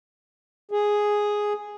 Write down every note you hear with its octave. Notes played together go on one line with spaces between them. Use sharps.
G#4